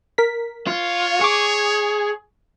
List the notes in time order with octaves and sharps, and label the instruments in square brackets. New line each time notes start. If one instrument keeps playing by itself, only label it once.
[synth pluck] A#4 B6
[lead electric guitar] F4 [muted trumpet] C#5
[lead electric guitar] G#4 [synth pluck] C#6 D6